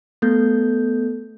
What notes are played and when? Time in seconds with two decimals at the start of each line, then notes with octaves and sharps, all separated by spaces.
0.22 A3 B3 A4 G6